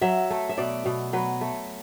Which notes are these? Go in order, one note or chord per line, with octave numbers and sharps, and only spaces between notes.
F#3 E5
A3
E5
B2 D5
B2
F#3 B4
A3